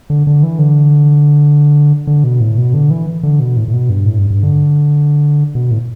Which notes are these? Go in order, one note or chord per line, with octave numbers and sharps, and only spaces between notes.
D3
D3
E3
D3
D3
B2
A2
B2
D3
E3
D3
B2
A2
A2
B2
G2
A2
G2
G2
D3
B2
A2